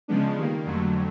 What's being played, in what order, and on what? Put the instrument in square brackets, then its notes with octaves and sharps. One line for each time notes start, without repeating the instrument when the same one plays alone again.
[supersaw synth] C#3 F3 G#3 B3 D4
D#3 G3 A#3
F2 D3 F#3 A3